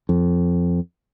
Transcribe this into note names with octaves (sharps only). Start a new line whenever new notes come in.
F2